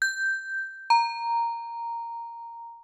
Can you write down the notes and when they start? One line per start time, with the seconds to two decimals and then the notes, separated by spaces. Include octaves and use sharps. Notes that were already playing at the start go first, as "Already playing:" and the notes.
0.02 G6
0.90 A#5